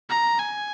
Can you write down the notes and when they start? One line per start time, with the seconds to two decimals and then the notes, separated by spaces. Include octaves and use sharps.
0.09 A#5
0.39 G#5